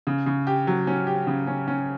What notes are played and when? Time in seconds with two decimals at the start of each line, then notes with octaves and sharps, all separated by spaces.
0.07 C#3
0.26 C#3
0.47 G4
0.67 F#3
0.87 C#4
1.07 G4
1.27 C#3
1.47 C#4
1.68 C#4